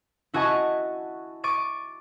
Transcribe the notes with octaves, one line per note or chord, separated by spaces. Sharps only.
E4 F#4 D#5 G#5 A5 C#6
C#6 D6 A6 D#7